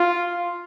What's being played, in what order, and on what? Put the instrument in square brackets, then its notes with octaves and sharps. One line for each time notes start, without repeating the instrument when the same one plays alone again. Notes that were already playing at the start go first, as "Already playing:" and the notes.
Already playing: [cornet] F4